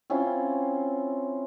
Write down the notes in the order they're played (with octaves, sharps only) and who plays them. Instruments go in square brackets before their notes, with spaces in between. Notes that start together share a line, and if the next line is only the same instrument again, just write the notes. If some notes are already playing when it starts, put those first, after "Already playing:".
[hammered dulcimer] C4 C#4 E4 F4